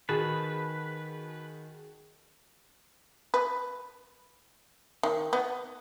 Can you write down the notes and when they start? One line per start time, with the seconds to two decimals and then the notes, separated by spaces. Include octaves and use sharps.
0.09 D#3 F#4 G#4 B4 A5
3.34 B4
5.03 D#3
5.33 B3